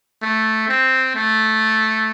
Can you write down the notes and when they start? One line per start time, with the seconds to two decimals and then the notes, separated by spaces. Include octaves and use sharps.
0.22 A3
0.69 C4
1.15 A3